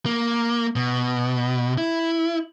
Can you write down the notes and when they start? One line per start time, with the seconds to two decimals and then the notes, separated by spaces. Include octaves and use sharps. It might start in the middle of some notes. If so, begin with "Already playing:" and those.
0.06 A#3
0.76 B2
1.78 E4